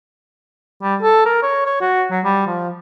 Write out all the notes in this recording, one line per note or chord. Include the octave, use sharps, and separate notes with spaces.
G3
A4
A#4
C#5
C#5
F#4
F#3
G3
F3